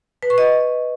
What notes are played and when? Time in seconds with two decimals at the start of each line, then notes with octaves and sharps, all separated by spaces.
0.23 B4
0.30 C#6
0.38 D#5